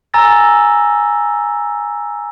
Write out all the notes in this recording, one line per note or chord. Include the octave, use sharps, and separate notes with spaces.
G#5 A#5 E6 A6 A#6